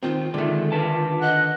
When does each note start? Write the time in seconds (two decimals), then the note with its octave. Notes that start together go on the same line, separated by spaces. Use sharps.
0.03 D#3 C4 F4
0.34 D3 D#3 G#3 A3
0.72 D4 B4 A5
1.21 D#5 F#5